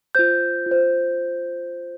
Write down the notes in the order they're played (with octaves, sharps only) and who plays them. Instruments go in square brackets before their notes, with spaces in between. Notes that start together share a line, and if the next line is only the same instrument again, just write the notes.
[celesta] F4 C5 G6
F4
C5